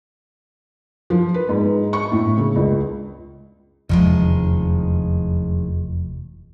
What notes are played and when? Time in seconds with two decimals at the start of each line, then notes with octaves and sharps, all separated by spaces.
1.10 F3
1.34 B4
1.49 G#2
1.93 C#6
2.12 A2
2.37 C#3
2.56 C#2
3.89 F1 E2 D#3 F3 G#3